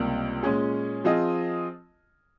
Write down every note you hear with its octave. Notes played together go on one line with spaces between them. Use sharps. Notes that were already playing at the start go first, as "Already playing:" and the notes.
Already playing: C#2 C3 G3 A#3
A#2 G#3 C#4 G#4
F3 C4 F4 G#4 D#5